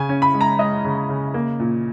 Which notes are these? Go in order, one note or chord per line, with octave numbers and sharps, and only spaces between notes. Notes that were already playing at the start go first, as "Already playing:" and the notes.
Already playing: C#3 G#5
C#4
B5
G#3
A#5
G#3 D#5
C#3
C#3
A#3
A#2